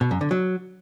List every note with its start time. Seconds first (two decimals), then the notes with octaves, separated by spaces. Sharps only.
0.01 B2
0.11 F#2
0.21 D3
0.31 F#3